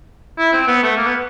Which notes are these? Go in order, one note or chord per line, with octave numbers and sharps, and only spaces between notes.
E4
C4
B3
A3
A#3
B3